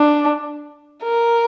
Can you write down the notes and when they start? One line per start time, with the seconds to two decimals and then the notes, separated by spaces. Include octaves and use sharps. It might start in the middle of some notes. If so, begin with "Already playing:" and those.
Already playing: D4
1.03 A#4